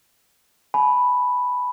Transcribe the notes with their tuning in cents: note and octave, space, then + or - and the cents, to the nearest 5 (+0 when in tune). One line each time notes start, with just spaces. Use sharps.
G#5 +40 B5 +0